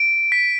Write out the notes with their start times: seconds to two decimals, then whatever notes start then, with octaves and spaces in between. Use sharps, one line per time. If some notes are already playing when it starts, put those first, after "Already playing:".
Already playing: D7
0.32 B6